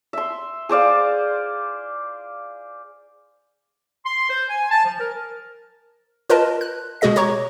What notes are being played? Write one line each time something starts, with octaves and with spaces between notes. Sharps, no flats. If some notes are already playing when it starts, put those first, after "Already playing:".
E5 C6
G#4 C5 D5 F5
C6
C5
G#5
A5
F3
A#4
F4 A#4 B4 D#5 A5
F#6
B2 G#3 F#4 G#4 D#5 A#6
G4 C#5 A#5 C#6